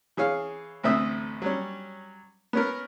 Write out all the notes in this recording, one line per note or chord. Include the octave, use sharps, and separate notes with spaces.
E3 G#4 C#5 F5
A1 D2 C4 E5 D#6
F#3 G3 C#4
B3 C#4 A#4